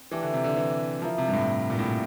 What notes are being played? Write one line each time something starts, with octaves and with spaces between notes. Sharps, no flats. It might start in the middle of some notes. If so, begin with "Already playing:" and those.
Already playing: C4
E3 A3 D4 G4
D3
C3
D3
E3
F3 E4 A#4 F5
C3
G2
A2
A#2
A2